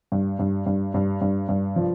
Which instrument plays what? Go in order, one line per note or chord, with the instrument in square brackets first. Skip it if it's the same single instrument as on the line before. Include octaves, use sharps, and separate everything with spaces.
[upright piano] G2
G2
G2
G2
G2
G2
F3